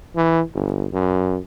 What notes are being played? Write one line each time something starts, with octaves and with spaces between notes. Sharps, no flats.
E3
G1
F#2